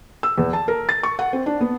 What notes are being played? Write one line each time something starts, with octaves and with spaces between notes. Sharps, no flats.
E6
E2
A5
A#4
A6
C#6
F#5
C4
D4
B3